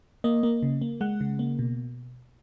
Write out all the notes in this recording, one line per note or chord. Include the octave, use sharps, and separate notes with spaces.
A#3 D#5
A#3
C#3
A#3
G#3 F#5
C#3
A#3
B2